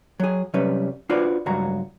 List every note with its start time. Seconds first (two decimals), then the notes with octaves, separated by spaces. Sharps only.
0.20 F#3 G#4
0.54 C3 F#3 G3 C#4 B4
1.09 D4 F4 F#4 B4 C5 D5
1.46 C#2 G2 F#3 F#4 A#5